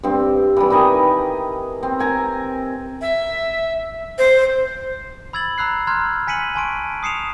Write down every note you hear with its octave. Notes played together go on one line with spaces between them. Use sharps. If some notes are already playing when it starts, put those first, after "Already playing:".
G2 C4
E3 G3
D#3 B4 D#5 G#5
C4
A#4 G#5 A#5
E5
C5
B5 E6 G#6 A6 F#7
A#5 B5 E6 F#6 C7
A#5 C6 F6 F#6 G#6
G#5 B6 C#7 D#7 F#7
G#5 A5 C6 C#6 D7 D#7
D#6 C7 C#7 E7 F7